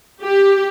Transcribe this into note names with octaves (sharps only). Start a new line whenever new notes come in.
G4